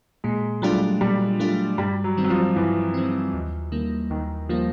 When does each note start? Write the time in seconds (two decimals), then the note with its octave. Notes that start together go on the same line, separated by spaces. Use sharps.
0.24 A#2 G#3
0.62 F#3 G3 A3 D4 F4
1.01 A#2 G3
1.39 F#3 A3 D4 F4
1.78 G2 G3
2.04 F#3
2.17 D#3 G3 C4
2.24 F#3
2.30 F3
2.56 G2 E3
2.94 D#3 G3 C4
3.33 D#2
3.72 D#3 G3 A#3
4.11 D#2 D#3
4.49 D#3 F3 G3 A#3